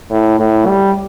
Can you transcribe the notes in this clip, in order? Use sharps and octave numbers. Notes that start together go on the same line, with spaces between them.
A2
A2
G3